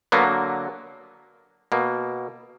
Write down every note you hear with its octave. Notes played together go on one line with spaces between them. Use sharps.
D3 F#3 A#3 B3
B2 A#3